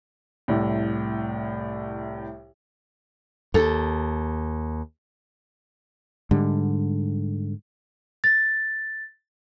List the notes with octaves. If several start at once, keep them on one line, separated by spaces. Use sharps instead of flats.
C2 A2
D#2 A4
G#2 D3 G3
A6